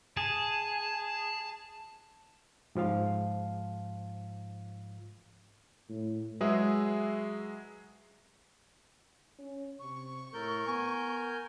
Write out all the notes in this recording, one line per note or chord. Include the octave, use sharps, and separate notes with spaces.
G#4 A5
G#2 F3 F4 F5
A2
F#3 G#3 G#4 B4 E5
C#4
C3 C#6
A2 A4 A#4 G6
B3 G#5